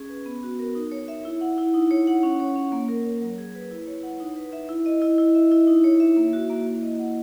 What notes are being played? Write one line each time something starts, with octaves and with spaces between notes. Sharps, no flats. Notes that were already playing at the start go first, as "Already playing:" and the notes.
Already playing: C#4 G#4
B4
B3
F#4
A#4
D#4
C#5
E5
E4
F#5
E4
D#4
C#5
F#5
C#4
C#5
C#4
A#3
A#4
C#5
F#3
G#4
B4
E4
C#5
F#5
D#4
B4
E5
E4
D#5
E4
E4
E5
E4
D#4
C#5
E5
A#3
F#4
A#3
E4
D#5
F#5